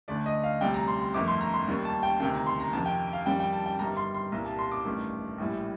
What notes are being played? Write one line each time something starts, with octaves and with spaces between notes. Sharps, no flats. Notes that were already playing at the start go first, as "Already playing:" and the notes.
D2 D3 A3 D5
D#5
F5
D2 C3 G3 G5
A#5
C6
C6
G1 F2 D#3 A3 D6
C6
A#5
C6
D#2 D#3 G3
A5
G5
D2 C3 D#3 G5
A#5
C6
A#5
F2 C3 D#3 A5
G5
F5
F2 D#3 G3 G5
G5
A5
G5
G1 G2 D#3 G3 A#5
C6
C6
C2 A#2 G3 A#5
A5
C6
D6
A1 G2 D#3 A3
A#1 A2 G3